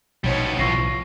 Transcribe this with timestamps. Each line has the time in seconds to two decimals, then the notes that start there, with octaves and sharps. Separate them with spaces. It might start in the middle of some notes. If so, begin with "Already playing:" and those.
0.24 A#1 B2 G3 D#4 C5 C#5
0.59 B1 A2 E3 F3 C#6 A#6 C7